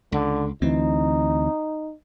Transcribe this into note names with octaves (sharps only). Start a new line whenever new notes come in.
C#2 D3
D2 E3 C4 D#4